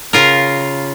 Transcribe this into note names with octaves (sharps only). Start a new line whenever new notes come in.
C#3 F4 A#4